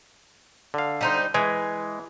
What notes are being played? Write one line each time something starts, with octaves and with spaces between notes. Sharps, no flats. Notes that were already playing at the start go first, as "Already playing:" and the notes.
D3 F5
G3 D#4 C5
E3 G#3 G#5